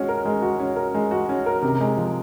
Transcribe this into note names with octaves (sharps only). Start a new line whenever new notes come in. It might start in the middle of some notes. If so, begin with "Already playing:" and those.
Already playing: G#3 C#4 F#4
A#4
G#3
F#4
C#4
A#4
G#3
F#4
C#4
A#4
C3
G#3
F3